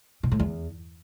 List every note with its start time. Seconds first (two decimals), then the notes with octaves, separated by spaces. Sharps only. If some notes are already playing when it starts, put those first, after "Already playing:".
0.23 B2
0.31 A2
0.39 E2